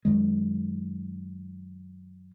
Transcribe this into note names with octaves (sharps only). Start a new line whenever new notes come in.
F#2 D#3 G#3